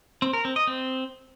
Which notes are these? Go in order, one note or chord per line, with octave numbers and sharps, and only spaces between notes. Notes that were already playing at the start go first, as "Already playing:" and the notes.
C4
A#4
C4
D#5
C4